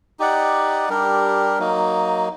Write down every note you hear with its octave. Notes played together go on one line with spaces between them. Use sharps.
D#4 G4 D5 F#5
G3 D4 G4 A#4
F#3 A#3 D#4